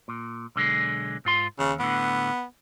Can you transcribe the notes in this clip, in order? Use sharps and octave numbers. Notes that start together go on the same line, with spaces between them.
A#2
B1 D3 G#3
G#2 F4 C6
D#2 C#3
A2 D3 B3